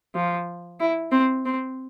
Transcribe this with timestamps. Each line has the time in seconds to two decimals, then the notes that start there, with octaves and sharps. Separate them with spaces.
0.15 F3
0.80 E4
1.11 C4
1.45 C4